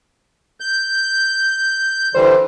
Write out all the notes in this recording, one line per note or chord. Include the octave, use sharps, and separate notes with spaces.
G6
D3 E3 G3 C5